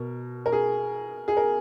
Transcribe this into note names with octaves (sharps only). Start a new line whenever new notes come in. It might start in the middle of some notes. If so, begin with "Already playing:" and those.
Already playing: B2 A#4
A#4
G#4
G#4
A#4